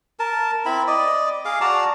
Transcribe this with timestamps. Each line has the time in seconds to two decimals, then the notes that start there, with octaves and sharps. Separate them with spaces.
0.19 A#4 A5
0.65 C4 E4 B5
0.87 D5 D#5
1.45 G#4 F5 D6
1.61 F#4 D5 A5 A#5